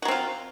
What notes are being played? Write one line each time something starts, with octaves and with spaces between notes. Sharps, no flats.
F#3 C4 F4 F#4